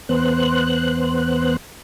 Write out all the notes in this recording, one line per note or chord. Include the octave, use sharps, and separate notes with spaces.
E2 B3 C5 F#6